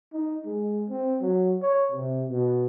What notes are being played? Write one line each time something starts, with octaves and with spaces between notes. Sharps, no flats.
D#4
G#3
C4
F#3
C#5
C3
B2